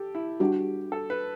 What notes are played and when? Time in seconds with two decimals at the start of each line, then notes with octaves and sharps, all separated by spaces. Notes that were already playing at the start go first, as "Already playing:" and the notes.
Already playing: G4 A4
0.15 E4
0.40 G3 D4 F#4 G4
0.92 A4
1.10 B4